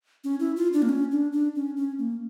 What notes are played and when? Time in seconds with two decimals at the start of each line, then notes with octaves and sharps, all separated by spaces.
0.24 C#4
0.40 E4
0.57 F4
0.73 D4
0.82 A#3
0.89 C#4
1.12 D4
1.33 D4
1.55 C#4
1.77 C#4
1.99 A#3